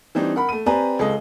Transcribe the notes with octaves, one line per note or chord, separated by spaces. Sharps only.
E3 G3 C4 D4 D#4
A#4 F#5 B5
A3 D#7
C4 G4 B4 D5 G#5 A#5
C#2 G#3 A4 D#5